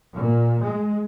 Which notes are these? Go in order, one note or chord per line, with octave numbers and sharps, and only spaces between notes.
A#2
G#3